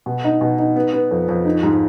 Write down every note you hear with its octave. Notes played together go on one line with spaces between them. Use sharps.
B2
D#4
B2
D#4
B3
B3
F2
F2
D#4
G#2